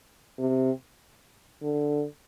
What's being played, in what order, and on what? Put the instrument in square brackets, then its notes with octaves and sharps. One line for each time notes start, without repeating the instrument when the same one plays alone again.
[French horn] C3
D3